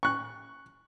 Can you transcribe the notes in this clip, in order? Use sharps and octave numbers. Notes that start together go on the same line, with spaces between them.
C#6 F#6